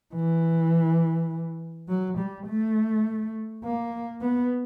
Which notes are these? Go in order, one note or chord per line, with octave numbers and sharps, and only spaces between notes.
E3
F#3
G3
A3
A#3
B3